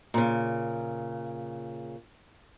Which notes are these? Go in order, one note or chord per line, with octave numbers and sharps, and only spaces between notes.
A#2 C#3